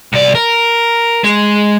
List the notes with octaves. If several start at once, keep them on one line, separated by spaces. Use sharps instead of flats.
C2 D5
A#4
G#3